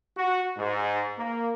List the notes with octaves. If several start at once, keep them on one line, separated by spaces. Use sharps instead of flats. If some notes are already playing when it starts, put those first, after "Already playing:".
F#4
G#2
A#3